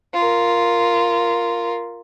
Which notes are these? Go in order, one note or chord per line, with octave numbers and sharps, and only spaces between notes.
F4 A#4